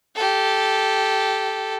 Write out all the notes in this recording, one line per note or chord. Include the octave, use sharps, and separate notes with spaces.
G4 A4